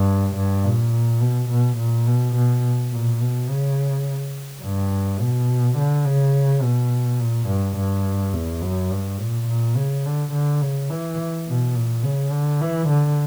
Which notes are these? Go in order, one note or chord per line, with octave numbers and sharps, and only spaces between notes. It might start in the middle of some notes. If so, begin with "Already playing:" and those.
Already playing: G2
G2
A#2
B2
B2
A#2
B2
B2
A#2
B2
C#3
G2
B2
D3
C#3
B2
A#2
G2
G2
E2
F#2
G2
A#2
A#2
C#3
D3
D3
C#3
E3
B2
A#2
C#3
D3
E3
D3